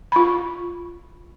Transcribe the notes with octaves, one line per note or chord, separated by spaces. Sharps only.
F4 B5